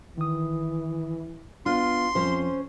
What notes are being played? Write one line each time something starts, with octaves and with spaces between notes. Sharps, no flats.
D#3 E3 D#6
B3 D4 F4 C6
F2 F3 C#4 C5